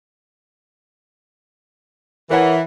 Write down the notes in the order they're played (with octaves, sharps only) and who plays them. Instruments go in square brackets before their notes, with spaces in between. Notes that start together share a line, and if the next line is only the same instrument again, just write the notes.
[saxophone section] E3 [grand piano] A#4 C#5 F#5